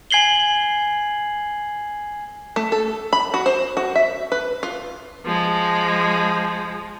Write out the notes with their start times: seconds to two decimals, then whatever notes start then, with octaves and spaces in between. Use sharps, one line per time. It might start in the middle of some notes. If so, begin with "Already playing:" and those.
0.11 G#5 G#6 C7 F#7 G7
2.56 A3
2.72 A4
3.13 B5
3.34 F#4
3.46 C5
3.77 F#4
3.96 E5
4.32 B4
4.63 F4
5.25 F3 G#3